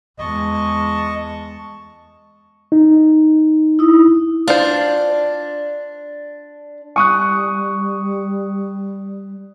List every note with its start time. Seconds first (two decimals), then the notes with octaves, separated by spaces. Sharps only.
0.19 E2 G#3 D#5 A5 C#6
2.72 D#4
3.79 E4 D#6
4.48 D4 F4 C5
6.96 G3 C#6 D#6 F#6